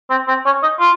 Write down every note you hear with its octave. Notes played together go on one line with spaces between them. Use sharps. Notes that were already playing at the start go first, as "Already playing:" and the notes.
C4
C4
C#4
D#4
F4